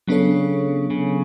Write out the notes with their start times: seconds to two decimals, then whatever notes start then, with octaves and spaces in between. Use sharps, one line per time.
0.08 C#3 F#3 B3 D4 A4 C#5
0.90 C#3